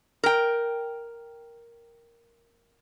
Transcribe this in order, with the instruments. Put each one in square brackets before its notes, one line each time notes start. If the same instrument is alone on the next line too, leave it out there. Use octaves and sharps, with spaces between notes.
[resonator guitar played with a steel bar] A#4 G5